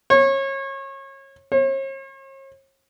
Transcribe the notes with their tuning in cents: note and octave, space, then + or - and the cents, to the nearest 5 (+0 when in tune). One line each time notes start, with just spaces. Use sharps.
C#5 -30
C#5 -45